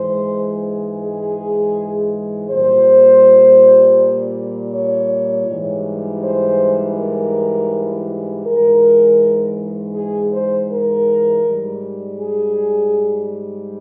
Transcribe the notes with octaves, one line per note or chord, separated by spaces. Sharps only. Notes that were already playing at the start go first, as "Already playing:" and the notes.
Already playing: G#2 E3 G#3 C5
G#4
A#2 G3 C5
C#5
G#2 E3 G3
C5
A#4
G#2 E3 G#3 A#4
G#4
C5
A#4
G#2 G3
G#4